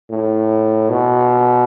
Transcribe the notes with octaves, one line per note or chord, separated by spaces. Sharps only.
A2
B2